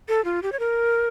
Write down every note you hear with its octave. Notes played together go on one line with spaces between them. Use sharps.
A4
F4
G4
C#5
A#4